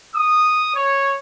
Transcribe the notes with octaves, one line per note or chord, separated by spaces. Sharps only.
D#6
C#5